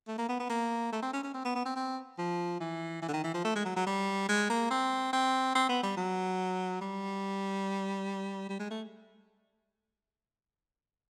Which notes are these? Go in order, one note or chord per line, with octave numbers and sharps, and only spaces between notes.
A3
A#3
B3
B3
A#3
A3
C4
C#4
C#4
C4
B3
B3
C4
C4
F3
E3
E3
D3
D#3
E3
F3
A3
G#3
F#3
F#3
G3
G#3
A#3
C4
C4
C4
B3
G3
F#3
G3
G3
G#3
A3